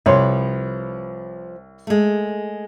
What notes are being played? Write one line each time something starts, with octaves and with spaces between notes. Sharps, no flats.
C2 F3 B4 C#5 C6
G#3 A3